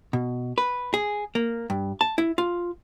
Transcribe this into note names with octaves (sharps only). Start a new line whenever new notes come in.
B2
B4
G#4
A#3
G2
A5
E4
F4